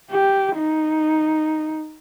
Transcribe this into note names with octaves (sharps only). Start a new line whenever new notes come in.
G4
D#4